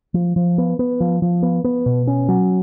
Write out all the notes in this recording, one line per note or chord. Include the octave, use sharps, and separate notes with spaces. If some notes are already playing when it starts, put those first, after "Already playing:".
F3
F3
B3
B3
F3
F3
B3
B3
B2
C#4
F#3